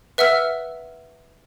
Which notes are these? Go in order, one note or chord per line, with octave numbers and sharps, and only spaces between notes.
B4 E5 F#5 E6 F6